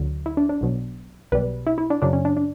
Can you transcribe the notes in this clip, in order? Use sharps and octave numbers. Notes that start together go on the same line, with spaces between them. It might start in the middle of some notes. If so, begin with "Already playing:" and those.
Already playing: D2 D3 F#3
E4
D4
D4
B1 B2 F#3
B1 B2 G3 B4
E4
E4
D4
F#2 C#3 F#3 D4
C#4
D4
D4